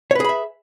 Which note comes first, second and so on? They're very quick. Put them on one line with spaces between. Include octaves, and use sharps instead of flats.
C#5 B4 G#4 B5 E5